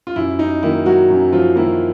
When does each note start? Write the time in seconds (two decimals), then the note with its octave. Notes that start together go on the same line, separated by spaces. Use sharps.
0.07 F4
0.16 F#2 E4
0.39 D#4
0.63 D#3 F#3 A#3 E4
0.86 F#3 F#4
1.10 F#2
1.33 F3 F4
1.56 D#3 F#3 A#3 E4